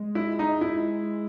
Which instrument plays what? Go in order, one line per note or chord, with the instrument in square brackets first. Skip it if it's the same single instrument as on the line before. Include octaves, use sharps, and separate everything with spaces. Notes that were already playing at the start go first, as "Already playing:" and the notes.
Already playing: [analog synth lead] G#3
[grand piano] E4
D#4
E4